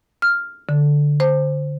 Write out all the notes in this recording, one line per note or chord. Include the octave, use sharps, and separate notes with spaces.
F6
D3
C5